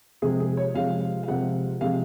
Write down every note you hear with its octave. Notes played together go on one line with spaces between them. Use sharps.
C3 F3 G#3 G#4
G#4
C#5
C3 F3 G#3 F5
F5
C3 F3 G#3 F#5
C3 F3 G#3 F5